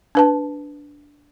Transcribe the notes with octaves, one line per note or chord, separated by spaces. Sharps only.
D4 B4 A5